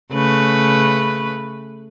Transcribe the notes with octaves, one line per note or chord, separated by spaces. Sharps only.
C#3 A3 B4